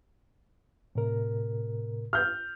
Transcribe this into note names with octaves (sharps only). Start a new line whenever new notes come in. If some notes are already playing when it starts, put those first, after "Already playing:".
A2 C3 A#4
F6 G6